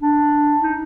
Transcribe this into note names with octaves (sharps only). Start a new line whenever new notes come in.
D4
D#4